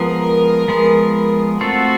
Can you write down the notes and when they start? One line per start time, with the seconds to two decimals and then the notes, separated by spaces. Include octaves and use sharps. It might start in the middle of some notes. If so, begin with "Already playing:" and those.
Already playing: F3 G#3 B3 A#4
0.68 F3 G#3 B3
1.60 A3 C4 F4 F#4 A4